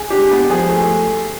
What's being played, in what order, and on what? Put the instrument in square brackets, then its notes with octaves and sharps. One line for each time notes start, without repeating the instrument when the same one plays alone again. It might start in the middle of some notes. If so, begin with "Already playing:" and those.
Already playing: [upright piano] G#4
[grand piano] D4 [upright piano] G4
[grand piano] B3
[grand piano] F3 [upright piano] G#4
[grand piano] A3